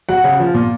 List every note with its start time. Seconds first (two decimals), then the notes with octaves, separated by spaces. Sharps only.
0.09 F#3 F#5
0.24 C#3
0.40 F3
0.54 A#2